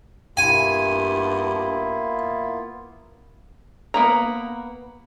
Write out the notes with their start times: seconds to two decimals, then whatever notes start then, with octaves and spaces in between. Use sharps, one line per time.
0.37 G2 A#3 B3 E4 F4 G#5
3.94 A#3 B3 A#5